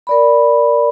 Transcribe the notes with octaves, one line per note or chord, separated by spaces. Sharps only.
A#4 D5 B5